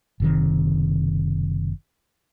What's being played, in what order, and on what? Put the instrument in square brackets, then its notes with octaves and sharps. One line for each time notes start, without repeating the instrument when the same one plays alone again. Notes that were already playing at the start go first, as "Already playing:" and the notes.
[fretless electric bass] F#1 C3 D#3